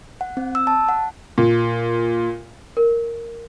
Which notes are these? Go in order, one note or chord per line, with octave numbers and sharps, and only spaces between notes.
F#5
C4
E6
A5
F#5
A#2
A#4